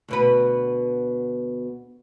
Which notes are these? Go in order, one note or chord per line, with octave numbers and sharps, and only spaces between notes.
D2 B2 B4